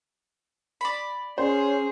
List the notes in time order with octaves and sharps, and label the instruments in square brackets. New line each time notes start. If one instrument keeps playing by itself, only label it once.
[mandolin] D5 B5
[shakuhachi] C#4 [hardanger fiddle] G#4 [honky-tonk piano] C5